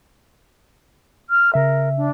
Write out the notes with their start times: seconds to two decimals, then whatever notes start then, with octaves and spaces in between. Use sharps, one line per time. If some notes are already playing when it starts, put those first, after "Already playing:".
1.29 F6
1.54 C#3 A#4 E5
1.97 D4